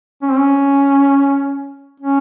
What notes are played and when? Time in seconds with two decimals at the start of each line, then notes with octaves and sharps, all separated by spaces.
0.22 C#4
0.30 C4
0.38 C#4
2.00 C#4